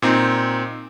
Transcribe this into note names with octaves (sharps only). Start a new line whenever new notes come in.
A#2 C4 D#4